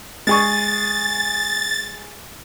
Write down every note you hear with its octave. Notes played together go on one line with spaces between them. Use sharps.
G#3 G#4 C#6 A6